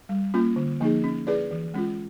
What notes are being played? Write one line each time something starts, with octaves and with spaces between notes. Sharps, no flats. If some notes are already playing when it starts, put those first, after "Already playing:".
G3
A#3 C#4 F4
D3
F3 A#3 D#4 G#4
C#4
E4 G#4 B4 D5
E3
G#3 C#4 F4